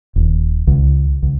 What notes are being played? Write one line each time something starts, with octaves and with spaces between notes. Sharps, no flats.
D#1
C#2
C#2